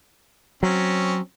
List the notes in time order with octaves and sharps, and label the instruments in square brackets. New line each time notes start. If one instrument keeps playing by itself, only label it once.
[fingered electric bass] F#3 [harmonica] C4 C#4